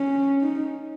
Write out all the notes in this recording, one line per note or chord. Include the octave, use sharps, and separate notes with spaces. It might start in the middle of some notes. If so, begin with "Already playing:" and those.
Already playing: C#4
D#4